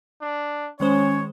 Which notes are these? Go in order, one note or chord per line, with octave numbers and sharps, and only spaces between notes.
D4
D#3 G#3 C#4 C5 C#5